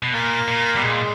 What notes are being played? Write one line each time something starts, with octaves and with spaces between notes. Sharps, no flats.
B2
A#2 A#3
A#2
B2 G3
A#2 G#3